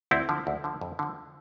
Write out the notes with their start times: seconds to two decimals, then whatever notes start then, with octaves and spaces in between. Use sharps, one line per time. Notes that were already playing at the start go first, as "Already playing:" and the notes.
0.11 D2 C4 E4
0.29 D3 F3
0.47 D2
0.64 D3 F3
0.81 F2
0.99 D3 F3